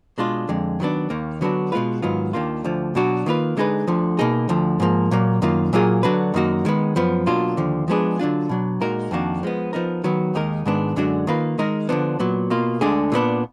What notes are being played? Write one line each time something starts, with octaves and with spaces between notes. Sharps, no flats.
B2 G#3 D4 F4
F2 D3 G#3
D#3 F#3 B3 D4
D#2 D#3 A#3
D3 F#3 B3 D4 F#4
B2 G#3 B3 F4 B4
G#2 D#3 F#3 B3 F4
D#2 D#3 A#3 D4 F4
D2 D3 F3
B2 F#3 D4 F#4
D#3 A#3 F4 B4
D3 G#3 D#4 G#4 B4
D2 D3 F3
B2 A#3 D#4 G#4
D2 D3 F3
G#2 F3 A#3
A#2 F#3 A#3
F#2 D#3 A#3 F4
A#2 F#3 A#3 F4 G#4
D3 F#3 D4 F#4 B4
F#2 D#3 A#3 D#4 F#4
D#3 G#3 B3
F#2 F3 B3
B2 F#3 A#3 D4 F4
D#2 D3 F3
F3 G#3 B3 D4 G#4
D3 F#3 D4 F4
B2 F#3 D4
A#2 G#3 D#4 F#4 A#4
F2 D#3 A#3 D4 F#4
F3 G#3 B3
F3 B3 D#4 A#4
D#3 F#3 B3
D#2 D#3 G#3 D#4 A#4
G#2 D#3 G#3 B3 D4
F#2 D3 G#3 D4 F#4
D#3 A#3 F4 B4
D#3 G#3 D#4 A#4
D3 F3 B3 D4
A#2 F#3 B3
B2 A#3 F4
D2 D3 G#3 D4 G#4
A#2 G#3 B3 D4